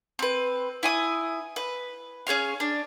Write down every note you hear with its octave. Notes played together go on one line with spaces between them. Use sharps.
C4 B4
E4 G#5 D#6
B4
C#4 G#4 C#5 F5
D4